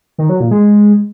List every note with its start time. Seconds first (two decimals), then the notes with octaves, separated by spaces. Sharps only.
0.18 D#3
0.29 F#3
0.40 A#2
0.51 G#3